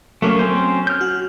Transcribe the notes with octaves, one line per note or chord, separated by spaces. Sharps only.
F#3 A3 A#3 C#4
C4 C#4 C5
F6 G6
F#4